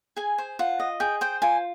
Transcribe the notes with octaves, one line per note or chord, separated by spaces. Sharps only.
G#4 G#5
C5
F4 F#5
D#5
G#4 G5
C5 G5
F4 G#5